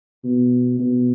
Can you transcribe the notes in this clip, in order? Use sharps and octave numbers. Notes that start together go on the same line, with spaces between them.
B2
B2